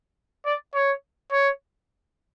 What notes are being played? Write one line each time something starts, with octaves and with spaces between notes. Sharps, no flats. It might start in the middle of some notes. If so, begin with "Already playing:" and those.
D5
C#5
C#5